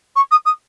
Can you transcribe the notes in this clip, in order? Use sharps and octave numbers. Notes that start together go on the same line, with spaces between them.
C#6
D#6
D#6